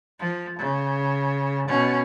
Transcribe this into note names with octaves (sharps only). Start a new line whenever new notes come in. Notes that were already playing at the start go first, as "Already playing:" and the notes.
F3
C#3
B2 C#4